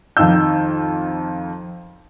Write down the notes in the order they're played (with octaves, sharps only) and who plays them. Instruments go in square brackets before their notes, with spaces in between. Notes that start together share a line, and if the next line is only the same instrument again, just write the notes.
[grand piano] F2 D#3 F5 E6 G6